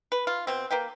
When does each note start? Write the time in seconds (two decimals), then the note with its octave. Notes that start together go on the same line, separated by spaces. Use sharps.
0.12 B4
0.27 F4
0.47 B2 C4
0.71 A#3 B4 G5